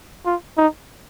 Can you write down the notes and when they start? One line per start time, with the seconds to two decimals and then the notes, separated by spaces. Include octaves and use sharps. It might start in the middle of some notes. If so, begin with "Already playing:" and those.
0.25 F4
0.57 D#4